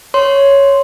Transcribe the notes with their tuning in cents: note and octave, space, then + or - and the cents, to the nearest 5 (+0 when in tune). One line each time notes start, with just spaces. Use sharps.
C#5 +0 C6 +0